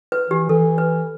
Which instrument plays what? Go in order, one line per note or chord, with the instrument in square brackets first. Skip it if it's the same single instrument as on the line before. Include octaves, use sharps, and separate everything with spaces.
[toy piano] B4
[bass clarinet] E3 [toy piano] G4
[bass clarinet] E3 [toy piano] A4
[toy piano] B4